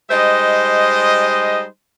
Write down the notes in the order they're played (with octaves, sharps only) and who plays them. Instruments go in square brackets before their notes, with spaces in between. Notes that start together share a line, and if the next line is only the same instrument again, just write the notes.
[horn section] G3 G#3 D#4 C5 D#5